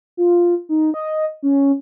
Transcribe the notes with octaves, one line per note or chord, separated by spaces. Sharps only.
F4
D#4
D#5
C#4